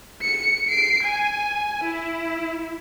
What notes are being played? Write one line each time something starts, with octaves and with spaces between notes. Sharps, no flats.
C#7
C7 D7
G#5
E4